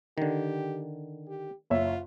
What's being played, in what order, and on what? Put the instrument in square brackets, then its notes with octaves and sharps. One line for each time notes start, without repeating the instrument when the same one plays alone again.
[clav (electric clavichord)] D3 D#3 [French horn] G4
[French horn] G4
[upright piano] F#1 C#5 E5 [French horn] F4